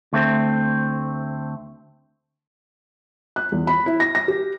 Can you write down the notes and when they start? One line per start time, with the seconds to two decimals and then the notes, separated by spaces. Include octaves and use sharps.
0.13 D2 A3 C4
3.36 F#6
3.52 E2
3.67 B5
3.86 E4
4.00 A#6
4.15 A#6
4.28 G4